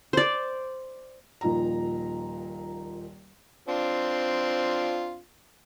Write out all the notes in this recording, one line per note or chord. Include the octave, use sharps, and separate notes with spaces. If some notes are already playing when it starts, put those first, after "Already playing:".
C5 D5
D#1 A#2 F3 D#4 A#5
C4 D4 F4